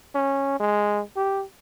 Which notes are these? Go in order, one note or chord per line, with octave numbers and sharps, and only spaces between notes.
C#4
G#3
G4